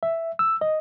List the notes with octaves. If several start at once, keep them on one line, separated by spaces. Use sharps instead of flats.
E5
E6
D#5